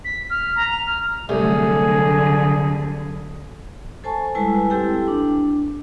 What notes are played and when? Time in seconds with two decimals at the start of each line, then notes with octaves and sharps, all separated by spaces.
0.05 B6
0.30 F6
0.56 A#5
0.71 F7
0.86 F6
1.29 C2 D3 F#3 A3 G#4
4.04 A4 C5 G#5 A5 C#6
4.35 G3 G#3 E4 B4 G#5 A5
4.70 C4 E4 G4 A4 G5
5.08 D4